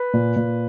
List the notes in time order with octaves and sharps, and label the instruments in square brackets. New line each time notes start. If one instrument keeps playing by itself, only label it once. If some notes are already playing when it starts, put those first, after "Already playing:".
Already playing: [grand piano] B4
A#2
A#2